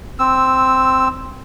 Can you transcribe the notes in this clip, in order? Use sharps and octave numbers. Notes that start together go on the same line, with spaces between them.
C4 E6